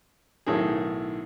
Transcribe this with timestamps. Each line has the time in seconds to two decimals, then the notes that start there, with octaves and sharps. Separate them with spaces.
0.47 B1 A2 D#3 G#4